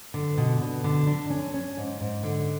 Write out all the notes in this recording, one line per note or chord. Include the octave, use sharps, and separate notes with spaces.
D3
B2
B2
D3
D4
C#4
C#4
G#2
G#2
D3